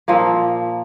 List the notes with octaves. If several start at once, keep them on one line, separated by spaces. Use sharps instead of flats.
A#2 F3 A#3